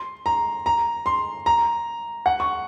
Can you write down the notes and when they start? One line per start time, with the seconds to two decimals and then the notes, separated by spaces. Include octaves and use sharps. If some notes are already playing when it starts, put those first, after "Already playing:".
Already playing: C6
0.26 A#5
0.66 A#5
1.06 C6
1.46 A#5
2.26 F#5
2.40 C#6